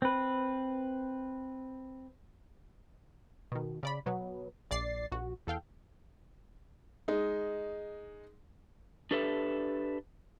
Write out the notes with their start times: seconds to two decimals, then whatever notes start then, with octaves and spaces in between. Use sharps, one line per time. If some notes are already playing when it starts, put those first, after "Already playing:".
0.02 C4 B4
3.52 B2 D#3
3.83 C#3 D5 B5
4.06 B2 F#3 B3
4.71 A#1 D5 A6 C7
5.12 A#1 F#4
5.47 E2 A4 F5 G5
7.08 G#3 D#4
9.11 D4 G4 A4 B4 E5